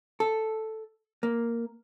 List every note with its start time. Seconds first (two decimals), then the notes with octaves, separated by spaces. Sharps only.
0.20 A4
1.23 A#3